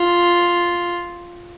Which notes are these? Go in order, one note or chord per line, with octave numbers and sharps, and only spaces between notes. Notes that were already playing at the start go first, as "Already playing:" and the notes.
Already playing: F4